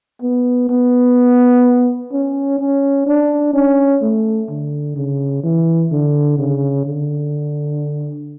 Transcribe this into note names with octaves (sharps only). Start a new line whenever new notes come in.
B3
B3
C#4
C#4
D4
C#4
A3
D3
C#3
E3
D3
C#3
D3